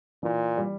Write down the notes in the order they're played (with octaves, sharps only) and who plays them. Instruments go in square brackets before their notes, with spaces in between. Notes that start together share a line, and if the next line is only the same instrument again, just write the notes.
[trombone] A#2 [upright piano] E3
[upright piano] G3